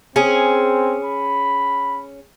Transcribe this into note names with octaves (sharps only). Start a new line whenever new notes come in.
C4 C#4 G#4
B5